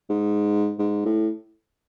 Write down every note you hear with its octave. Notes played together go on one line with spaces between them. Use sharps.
G#2
G#2
A2